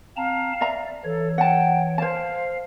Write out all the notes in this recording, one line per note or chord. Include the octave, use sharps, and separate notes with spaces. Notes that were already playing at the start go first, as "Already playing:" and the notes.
C4 F5 A5 A#5
D5 E5 A#5
E3 A4 C#5
F#5 G5 A5
C5 F5 A5